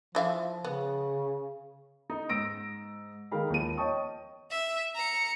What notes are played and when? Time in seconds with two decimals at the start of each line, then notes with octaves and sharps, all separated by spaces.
0.15 E3 F3 E5 F5
0.64 C#3 B3
2.10 D#4
2.29 G#2 E6 A#6 D7
3.32 D#3 G#3 A#4 F5 G5 B5
3.50 D#2 F3 D#7
3.77 C#5 D#5 G5 A5 C#6 D#6
4.51 E5
4.95 A#5 C#7